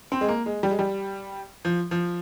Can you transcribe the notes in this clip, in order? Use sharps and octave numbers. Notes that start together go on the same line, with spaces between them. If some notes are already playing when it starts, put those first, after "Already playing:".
C4
G#3
A#3
G#3
G3
G#3
G3
F3
F3